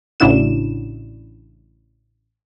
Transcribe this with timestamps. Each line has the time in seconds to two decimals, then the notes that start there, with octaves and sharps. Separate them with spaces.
0.20 A1 C#3 D4 E4 F#4 E7